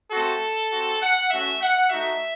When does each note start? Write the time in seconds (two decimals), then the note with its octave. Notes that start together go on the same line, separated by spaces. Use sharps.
0.12 A3 C4 F#4 A4
0.72 C4 F#4
1.02 F#5
1.30 A3 C#4 F#4 E5
1.61 F#5
1.90 A3 D#4 F#4 E5